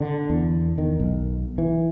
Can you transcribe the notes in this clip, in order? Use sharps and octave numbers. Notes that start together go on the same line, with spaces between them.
D3
E2
D#3
B1
E3